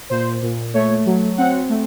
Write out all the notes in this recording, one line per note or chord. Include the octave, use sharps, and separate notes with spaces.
A#2 C5
A#2
A3 C#5
F#3
C4 F#5
A3